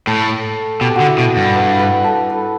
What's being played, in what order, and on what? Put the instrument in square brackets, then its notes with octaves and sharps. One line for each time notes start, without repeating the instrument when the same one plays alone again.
[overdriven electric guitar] A2 [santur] A4
[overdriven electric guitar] B2 [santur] G4
[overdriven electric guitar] D3 [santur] F#4
[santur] E4
[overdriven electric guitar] B2
G2
[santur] B4
B4
A4
B4